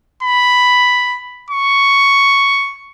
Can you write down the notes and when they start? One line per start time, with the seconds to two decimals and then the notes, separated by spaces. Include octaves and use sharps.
0.23 B5
1.50 C#6